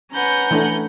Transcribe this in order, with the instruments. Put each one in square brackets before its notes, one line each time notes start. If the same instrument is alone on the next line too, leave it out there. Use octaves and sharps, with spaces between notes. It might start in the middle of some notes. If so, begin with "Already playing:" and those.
[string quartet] C#4 B4 F#5 [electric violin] A#5 G6
[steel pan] E3 A3 D4